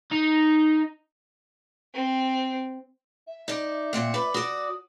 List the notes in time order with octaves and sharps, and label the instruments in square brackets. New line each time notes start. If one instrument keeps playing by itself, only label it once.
[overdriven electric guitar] D#4
[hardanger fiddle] C4
[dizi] E5
[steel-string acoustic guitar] D#4 D5
A#2 C4 F#5
B4 D5
[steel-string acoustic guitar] F#4 D5 [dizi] D#6